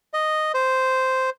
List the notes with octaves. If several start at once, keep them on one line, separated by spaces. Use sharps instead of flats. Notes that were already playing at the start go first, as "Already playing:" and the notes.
D#5
C5